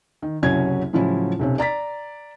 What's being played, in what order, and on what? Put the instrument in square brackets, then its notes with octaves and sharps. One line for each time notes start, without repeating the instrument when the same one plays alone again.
[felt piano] D#3
F#1 C2 F#3 C#4 G#6
A2 C#3 F3 F#3 C#4 E4
B1 C3 C#4
D5 A#5 A6 B6